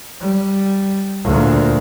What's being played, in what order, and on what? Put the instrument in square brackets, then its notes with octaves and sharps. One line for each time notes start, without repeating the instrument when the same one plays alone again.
[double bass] G3
D2 A#2